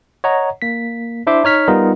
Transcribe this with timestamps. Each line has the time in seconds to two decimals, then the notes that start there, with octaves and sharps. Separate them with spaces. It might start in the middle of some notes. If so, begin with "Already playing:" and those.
0.24 C#5 D#5 F#5 A#5
0.62 A#3 B6
1.27 D4 E4 C5 E5 C6 D6
1.44 D#4 C#5 F6 B6
1.68 G3 B3 D#4 F4 A#4 D#5